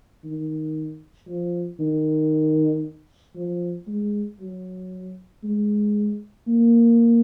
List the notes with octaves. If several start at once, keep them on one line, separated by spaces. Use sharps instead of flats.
D#3
F3
D#3
F3
G#3
F#3
G#3
A#3